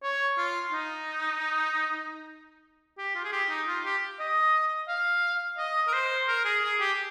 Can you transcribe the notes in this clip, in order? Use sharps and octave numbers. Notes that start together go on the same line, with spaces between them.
C#5
F4
D#4
G4
F4
G#4
G4
D#4
F4
G4
D#5
F5
D#5
A#4
C5
A#4
G#4
G#4
G4